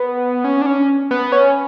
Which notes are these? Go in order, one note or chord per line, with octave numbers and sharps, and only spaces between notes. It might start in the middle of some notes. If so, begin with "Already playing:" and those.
Already playing: B3
C#4
D4
C#4
B3
C#4